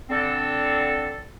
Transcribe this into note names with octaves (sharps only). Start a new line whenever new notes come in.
D3 C4 A4